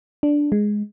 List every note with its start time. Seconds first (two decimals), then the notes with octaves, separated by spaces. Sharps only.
0.23 D4
0.52 G#3